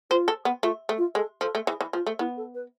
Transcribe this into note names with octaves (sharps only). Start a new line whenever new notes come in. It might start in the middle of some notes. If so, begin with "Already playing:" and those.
F4 C5
A4
B3
A3 F4
A3
F4
G#3 A4
F3 A4
A3
E3 G#4
E3
F3 F4
A3
B3 E4
A4
B4